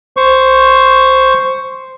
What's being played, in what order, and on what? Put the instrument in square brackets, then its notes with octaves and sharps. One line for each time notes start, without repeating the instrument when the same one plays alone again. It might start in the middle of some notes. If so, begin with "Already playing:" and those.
[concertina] C5 C#6